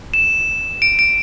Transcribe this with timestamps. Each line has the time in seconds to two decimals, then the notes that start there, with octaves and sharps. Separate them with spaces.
0.14 E7
0.82 D7
0.99 D7